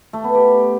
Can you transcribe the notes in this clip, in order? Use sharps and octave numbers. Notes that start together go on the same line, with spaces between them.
A3
B3
G4